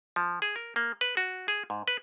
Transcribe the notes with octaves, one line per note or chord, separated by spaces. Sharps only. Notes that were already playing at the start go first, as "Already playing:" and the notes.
F3
G#4
A#4
A#3
B4
F#4
G#4
G#2
B4